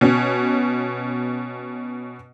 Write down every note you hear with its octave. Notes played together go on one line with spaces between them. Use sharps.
B2 C#4